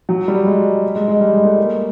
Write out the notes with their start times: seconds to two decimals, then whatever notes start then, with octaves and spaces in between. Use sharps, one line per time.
0.09 F#3
0.28 G3
0.46 G#3
0.96 G#3
1.08 G#3
1.21 G3
1.34 G#3
1.45 A3
1.58 A#3